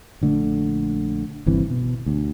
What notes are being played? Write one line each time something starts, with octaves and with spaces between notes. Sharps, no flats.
A#1 D3 A3
G1 C2 E3 C4
B2
D2